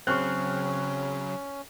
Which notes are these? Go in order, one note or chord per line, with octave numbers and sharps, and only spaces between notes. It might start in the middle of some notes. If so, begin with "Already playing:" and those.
C#3 F#3 C4 C#4 C#6 F6 F#6